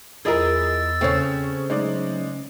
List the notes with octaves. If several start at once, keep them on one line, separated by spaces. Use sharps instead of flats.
E2 F3 E4 G#4 A#4 D#5 E6 A6
C#3 A3 C4 C#4 C#5
F#3 G#3 A3 D#4 D5